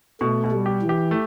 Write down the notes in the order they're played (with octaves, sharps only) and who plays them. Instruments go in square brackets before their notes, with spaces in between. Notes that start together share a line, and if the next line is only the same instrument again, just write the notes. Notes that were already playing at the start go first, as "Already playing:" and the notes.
[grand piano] B2 [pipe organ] A3
[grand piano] B2
[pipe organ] G3
[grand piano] G4
[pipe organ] E3
[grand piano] G4
A3